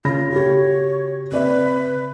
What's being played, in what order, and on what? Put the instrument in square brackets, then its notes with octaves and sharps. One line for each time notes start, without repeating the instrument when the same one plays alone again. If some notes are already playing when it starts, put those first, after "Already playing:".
[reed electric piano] C#3 [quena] F4 [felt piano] B5 A#6
[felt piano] F#4 G4 [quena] C#5
[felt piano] C4 D5 E5 [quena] B4